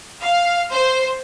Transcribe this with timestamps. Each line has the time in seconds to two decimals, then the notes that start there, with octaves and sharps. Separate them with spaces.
0.23 F5
0.72 C5